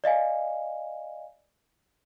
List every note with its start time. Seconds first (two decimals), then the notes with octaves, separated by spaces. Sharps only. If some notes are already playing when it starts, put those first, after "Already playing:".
0.04 D5 D#5 F5 G#5